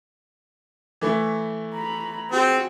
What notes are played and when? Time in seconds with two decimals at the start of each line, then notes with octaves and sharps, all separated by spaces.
1.01 E3 A3 E4
1.75 A#5 B5
2.31 C4 F#4 G#4